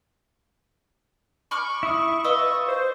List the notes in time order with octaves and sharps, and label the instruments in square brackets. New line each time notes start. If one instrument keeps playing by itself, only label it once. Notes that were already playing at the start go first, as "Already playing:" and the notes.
[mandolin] B5 D6 F6 [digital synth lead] C#6
[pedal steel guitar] E4 D#6
[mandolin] F4 B4 D#5 [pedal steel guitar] E6
[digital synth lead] C5